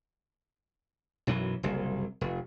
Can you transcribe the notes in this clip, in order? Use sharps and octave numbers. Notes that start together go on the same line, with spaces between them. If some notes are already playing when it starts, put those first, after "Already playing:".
B1 F#2 E3 F#3
F#1 C2
F1